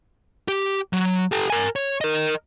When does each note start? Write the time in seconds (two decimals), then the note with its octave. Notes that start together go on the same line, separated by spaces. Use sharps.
0.48 G4
0.93 F#3
1.32 G4 A4
1.50 A#4 G#5
1.76 C#5
2.01 A#4 D#5